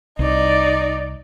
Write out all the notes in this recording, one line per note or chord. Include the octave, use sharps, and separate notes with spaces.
C2 D#4 D5